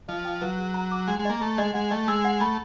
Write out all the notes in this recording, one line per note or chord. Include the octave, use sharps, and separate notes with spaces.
F3 D#5
G5
F#3 B4
G#4
A#5
D6
G#3 F#5
G#3
A#3 D#5
A3 A#5
G#3 D#5
G#3 F#5
A3 D#5
G#3 E6
F#5
A3 B5